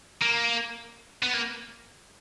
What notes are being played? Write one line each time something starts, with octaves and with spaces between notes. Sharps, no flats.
A#3
B3
A#3